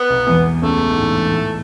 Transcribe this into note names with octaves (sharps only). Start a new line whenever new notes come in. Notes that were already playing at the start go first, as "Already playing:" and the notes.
Already playing: B3
B1 B2
E2 E3
C#2 C#3 A3
G#2
A2
A2